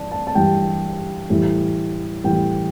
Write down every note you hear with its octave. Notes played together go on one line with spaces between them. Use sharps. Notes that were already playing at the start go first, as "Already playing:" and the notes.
Already playing: G2 E3 D5 A5
A5
A5
G2 E3 G3 G5
A2 E3 G3
A2 E3 G3 G5